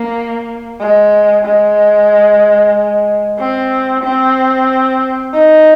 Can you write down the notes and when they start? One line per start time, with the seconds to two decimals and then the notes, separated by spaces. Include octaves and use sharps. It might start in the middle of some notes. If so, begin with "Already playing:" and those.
Already playing: A#3
0.80 G#3
1.45 G#3
3.39 C4
4.03 C4
5.33 D#4